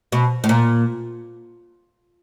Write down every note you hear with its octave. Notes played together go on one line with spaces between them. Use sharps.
B2
A2
A#2